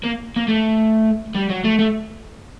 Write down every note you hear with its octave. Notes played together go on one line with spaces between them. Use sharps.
A#3
A#3
A3
G3
F#3
A3
A3